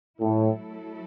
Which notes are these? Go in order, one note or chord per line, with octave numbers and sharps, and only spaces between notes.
A2 F#3 A3 E4 A4